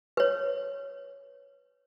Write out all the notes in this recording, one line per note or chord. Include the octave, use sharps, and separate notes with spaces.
B4 C#5